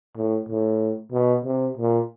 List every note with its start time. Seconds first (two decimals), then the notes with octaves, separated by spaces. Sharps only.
0.17 A2
0.49 A2
1.12 B2
1.45 C3
1.77 A#2